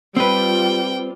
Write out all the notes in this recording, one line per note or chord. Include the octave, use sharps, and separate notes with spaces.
G3 C4 F4 B4 G5